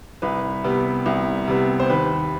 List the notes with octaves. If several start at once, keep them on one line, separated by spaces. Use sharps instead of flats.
C2 B4
C3 G3 B3
C2
C3 G3 B3
C5
D#2 B4